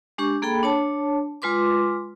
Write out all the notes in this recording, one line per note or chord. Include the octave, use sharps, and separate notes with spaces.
G#3 D4 G4 C#6
A#3 G#4 A4 G5 B5
D4 C#5 A5
G#3 F4 B4 C6 D6